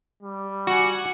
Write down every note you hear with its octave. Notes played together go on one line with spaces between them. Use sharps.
G3
F#4 F#5 G#5